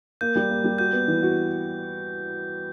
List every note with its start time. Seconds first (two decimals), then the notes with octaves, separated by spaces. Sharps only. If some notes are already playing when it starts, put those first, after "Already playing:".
0.21 A#3 G6
0.36 G3
0.50 A#3
0.64 G3
0.79 F#4 G6
0.93 B3
1.08 E3
1.22 F#4